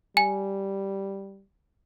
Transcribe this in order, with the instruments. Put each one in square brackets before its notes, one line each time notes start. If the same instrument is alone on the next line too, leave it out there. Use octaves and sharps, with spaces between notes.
[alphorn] G3 [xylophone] G#5